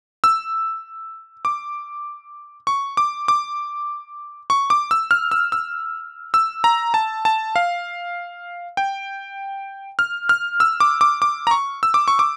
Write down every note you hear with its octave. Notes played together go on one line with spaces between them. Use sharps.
E6
D6
C#6
D6
D6
C#6
D6
E6
F6
E6
E6
E6
A#5
A5
A5
F5
G5
F6
F6
E6
D6
D6
D6
A#5
C#6
E6
D6
C#6
D6